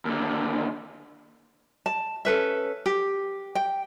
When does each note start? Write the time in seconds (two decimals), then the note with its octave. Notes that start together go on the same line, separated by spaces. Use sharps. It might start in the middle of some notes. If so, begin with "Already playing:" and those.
0.05 D#2 D3
1.86 A5
2.25 C#4 A4 B4 E5
2.86 G4
3.55 G5